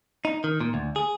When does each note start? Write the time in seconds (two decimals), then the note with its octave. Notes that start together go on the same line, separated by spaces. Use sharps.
0.25 D#4
0.44 D#3
0.61 A#2
0.74 D2
0.96 G#4